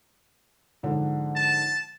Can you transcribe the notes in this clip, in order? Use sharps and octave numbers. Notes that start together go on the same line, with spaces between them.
G#2 D3 F3
A5